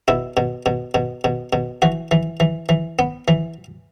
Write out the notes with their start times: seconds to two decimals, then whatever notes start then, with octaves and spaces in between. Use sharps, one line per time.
0.08 B2 E4
0.37 B2
0.66 B2
0.94 B2
1.24 B2
1.53 B2
1.82 E3 F#4
2.11 E3
2.40 E3
2.69 E3
2.99 B3
3.28 E3